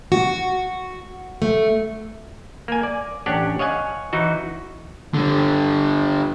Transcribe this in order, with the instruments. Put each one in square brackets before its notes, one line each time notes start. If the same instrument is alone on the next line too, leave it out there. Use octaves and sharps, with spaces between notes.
[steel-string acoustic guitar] F#4
A3
[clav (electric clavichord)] A#3 G#5
D5
A1 C#4 D4 G4 F#5
C#5 D#5 F5 F#5 G#5
E3 D#4 F#4
[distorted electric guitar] D3 G3